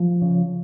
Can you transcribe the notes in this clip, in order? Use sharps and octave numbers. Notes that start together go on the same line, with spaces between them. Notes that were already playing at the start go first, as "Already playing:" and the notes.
Already playing: F3
C#3